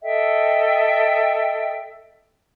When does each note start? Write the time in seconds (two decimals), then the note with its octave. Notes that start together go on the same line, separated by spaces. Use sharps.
0.02 A4 D#5 E5 G5